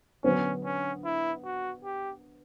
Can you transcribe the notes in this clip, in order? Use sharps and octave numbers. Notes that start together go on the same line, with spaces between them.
D3 F#3 B3 C#4
C#4
E4
F#4
G4